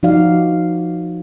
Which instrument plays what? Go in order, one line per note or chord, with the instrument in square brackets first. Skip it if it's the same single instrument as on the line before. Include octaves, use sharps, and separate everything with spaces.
[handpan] F3 D#4 F#4 D5 F5